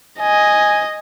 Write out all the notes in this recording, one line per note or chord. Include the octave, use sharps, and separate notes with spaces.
D#5 G#5